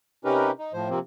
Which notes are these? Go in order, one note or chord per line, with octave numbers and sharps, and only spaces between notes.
C3 C#4 D#4 G4 A#4 B4
D#4
A2 F3 C5
C3 F3 A#3 C4